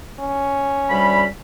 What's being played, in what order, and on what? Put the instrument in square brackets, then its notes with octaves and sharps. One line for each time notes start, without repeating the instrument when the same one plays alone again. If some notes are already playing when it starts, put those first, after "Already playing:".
[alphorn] C#4
[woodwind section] D2 G3 B5